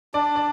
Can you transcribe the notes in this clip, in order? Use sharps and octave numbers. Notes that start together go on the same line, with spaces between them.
D4 D5
D5